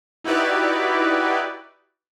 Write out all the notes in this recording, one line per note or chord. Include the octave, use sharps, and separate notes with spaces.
D#4 E4 F#4 G4 B4 D5